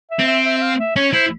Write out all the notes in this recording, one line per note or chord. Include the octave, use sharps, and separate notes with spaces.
E5
C4
E5
E5
E5
F5
E5
C#4 C#5
E4 C5